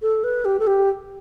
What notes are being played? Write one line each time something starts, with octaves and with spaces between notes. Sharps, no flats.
A4
B4
G4
A4
G4